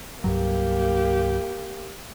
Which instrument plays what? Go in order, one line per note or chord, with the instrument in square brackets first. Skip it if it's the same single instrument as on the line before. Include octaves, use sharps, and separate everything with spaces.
[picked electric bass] C2 G2 F#3 [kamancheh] A#3 G4